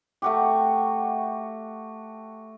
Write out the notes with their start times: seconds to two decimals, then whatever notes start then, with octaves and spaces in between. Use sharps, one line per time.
0.22 A3 F#4 G4